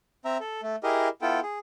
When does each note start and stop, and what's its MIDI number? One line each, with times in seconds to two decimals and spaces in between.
0.25 0.37 60
0.25 0.37 76
0.25 0.37 82
0.40 0.61 69
0.63 0.76 57
0.83 1.09 64
0.83 1.09 67
0.83 1.09 68
0.83 1.09 70
0.83 1.09 75
1.22 1.40 59
1.22 1.40 64
1.22 1.40 65
1.22 1.40 69
1.22 1.40 79
1.43 1.59 68